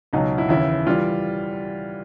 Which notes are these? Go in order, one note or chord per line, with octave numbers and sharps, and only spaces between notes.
C#2 B2 F#3 D#4
E4
D#2 C#3 E3 E4
E3 G3 F4